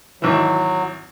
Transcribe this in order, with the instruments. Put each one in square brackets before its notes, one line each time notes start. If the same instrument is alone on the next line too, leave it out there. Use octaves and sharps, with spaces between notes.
[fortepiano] G#1 E3 [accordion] F#3